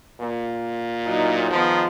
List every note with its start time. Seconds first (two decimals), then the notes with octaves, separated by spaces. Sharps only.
0.20 A#2
1.06 A2 F#3 D#4
1.50 D#3 F3 G#3 B3